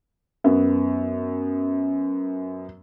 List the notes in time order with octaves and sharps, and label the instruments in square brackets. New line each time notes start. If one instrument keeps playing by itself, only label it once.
[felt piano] F#2 B3